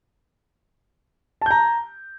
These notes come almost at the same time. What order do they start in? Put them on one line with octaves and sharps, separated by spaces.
A5 G6 A#5